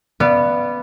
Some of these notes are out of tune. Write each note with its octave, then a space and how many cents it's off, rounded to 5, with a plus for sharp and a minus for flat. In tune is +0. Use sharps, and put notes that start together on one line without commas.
B3 +0 D5 +15 F5 -35